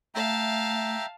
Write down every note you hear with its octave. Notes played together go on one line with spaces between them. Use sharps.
A3 E5 F5 G5 A5 A#5